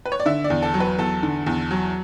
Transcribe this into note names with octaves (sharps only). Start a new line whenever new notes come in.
B4
C#5
D5
D3 E5
D5
E2
A4
F#3
B4
E2 A4
D3
E2
F#3